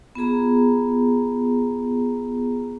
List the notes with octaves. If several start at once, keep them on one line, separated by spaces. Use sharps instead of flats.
B3 F4 G#4 A#5